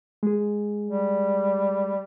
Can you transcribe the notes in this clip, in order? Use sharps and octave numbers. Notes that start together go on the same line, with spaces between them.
G#3 G#4
G3